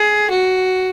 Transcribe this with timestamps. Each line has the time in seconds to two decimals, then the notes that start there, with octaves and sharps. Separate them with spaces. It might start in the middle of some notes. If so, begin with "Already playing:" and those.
Already playing: G#4
0.30 F#4